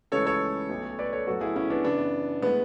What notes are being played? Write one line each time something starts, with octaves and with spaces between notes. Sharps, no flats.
C#2 C#3 E3 A3 A4 C#5
A4 C#5
B1 B2 A3
B4 D5
A4 C#5
A1 A2 F#3 B3 F#4 A4
E4 G#4
C#4 E4
B3 D4
F#2 C#3 E3 B3 D4
A2 G#3 B3